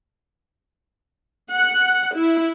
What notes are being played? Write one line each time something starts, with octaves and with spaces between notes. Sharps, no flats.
F#5
E4